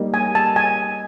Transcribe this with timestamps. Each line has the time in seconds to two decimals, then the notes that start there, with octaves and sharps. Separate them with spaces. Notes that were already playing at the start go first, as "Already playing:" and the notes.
Already playing: G3 A#3 D#4
0.14 G#5
0.35 A5
0.56 G#5